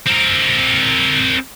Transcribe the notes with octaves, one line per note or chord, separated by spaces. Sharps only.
C4 A#4